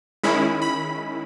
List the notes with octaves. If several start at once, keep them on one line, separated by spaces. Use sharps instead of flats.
D#3 G#3 C#4 E4 B5
B5